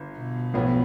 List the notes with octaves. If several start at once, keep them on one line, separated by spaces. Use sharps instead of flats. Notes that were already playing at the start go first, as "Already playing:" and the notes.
Already playing: G1
B2
B1 A2 F3 B3